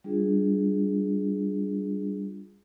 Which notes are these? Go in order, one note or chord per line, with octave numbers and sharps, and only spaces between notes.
G3 D4 F4 G#4